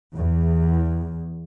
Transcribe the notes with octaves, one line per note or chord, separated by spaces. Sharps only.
E2